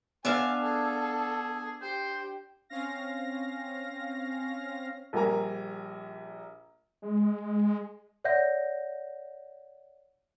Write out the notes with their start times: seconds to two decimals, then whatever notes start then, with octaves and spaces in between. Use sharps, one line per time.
0.25 B3 D4 E5 F5 G#5
0.63 G#4 A4
1.12 G#4
1.82 G4 C5
2.69 C4 C#4 F5 A#6
5.13 A#1 G3 A#3 A#4 G#5 A#5
7.02 G#3
8.24 C#5 D5 E5 F#5 G6 A#6